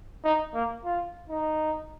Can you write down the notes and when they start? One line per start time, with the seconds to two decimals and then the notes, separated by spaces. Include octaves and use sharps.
0.24 D#4
0.54 A#3
0.85 F4
1.30 D#4